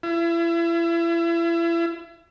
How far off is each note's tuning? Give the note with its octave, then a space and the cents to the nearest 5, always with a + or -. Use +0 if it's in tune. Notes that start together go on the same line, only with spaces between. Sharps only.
E4 +35